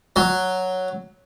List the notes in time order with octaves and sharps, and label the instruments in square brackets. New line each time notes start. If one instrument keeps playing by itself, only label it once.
[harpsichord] F#3